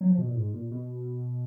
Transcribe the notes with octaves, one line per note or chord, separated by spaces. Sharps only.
F#3
F3
B2
A#2
G#2
A#2
B2